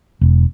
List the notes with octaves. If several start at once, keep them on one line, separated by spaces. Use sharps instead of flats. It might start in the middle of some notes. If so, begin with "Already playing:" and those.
E1